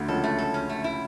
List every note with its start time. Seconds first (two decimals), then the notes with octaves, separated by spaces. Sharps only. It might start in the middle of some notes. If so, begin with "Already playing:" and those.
Already playing: D2 D3
0.08 C#2 C#3 A4
0.24 A3
0.39 A4
0.54 C#4
0.69 A3
0.84 E4